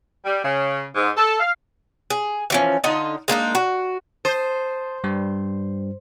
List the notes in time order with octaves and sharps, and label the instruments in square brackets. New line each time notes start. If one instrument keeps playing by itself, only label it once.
[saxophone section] G3
C#3
G#2
A4
F5
[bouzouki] G#4
E3 F3 C#4
D3 D#4 F4 D#5
G#3 A#3 D4 D#4
F#4
[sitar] C5 [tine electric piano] A5 D#6
[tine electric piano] G2 G3